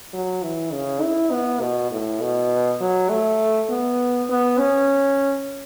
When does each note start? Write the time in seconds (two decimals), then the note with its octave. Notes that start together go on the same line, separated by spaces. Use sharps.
0.13 F#3
0.43 E3
0.72 C#3
1.02 E4
1.32 B3
1.61 B2
1.91 A2
2.21 B2
2.81 F#3
3.10 A3
3.70 B3
4.29 B3
4.58 C#4